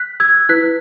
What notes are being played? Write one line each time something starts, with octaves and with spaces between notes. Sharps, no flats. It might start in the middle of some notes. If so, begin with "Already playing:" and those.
Already playing: F#6 B6
E6 G#6
E4 B4 F#6 B6